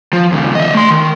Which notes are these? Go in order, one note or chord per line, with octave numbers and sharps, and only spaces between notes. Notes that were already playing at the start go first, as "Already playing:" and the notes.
F3
D#2 C#3
D#5 E5
A3 C6
D#3